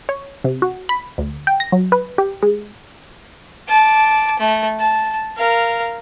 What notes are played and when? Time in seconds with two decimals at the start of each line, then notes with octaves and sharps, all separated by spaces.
0.09 C#5
0.44 C3
0.62 F#4
0.89 B5
1.18 D2
1.47 G5
1.60 A#6
1.72 F#3
1.92 B4
2.18 G4
2.43 G#3
3.68 A5 D6
4.39 A3
4.79 A5
5.37 A#4 F5